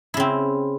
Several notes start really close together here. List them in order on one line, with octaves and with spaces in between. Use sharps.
E4 C#3 C4